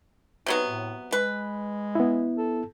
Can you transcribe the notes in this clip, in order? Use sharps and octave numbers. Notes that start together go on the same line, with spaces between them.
C3 F#3 B3 D#4
A2
G#3 B4
B3 E4
A4